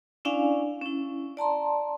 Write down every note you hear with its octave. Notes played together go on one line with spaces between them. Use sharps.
C#4 D4 E4 D5 F5 G#5
C#4 E4
D5 A5 A#5 C6